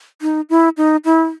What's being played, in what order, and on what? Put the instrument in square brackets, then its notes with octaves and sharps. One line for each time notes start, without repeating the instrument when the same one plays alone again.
[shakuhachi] D#4
E4
D#4
E4